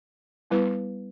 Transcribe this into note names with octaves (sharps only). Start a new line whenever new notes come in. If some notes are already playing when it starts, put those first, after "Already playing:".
G3 B3 E4 B4